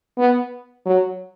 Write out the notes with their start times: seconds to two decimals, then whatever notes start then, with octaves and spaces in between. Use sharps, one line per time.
0.18 B3
0.86 F#3